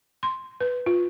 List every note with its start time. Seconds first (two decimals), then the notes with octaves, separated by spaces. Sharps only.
0.23 C6
0.60 B4
0.86 F4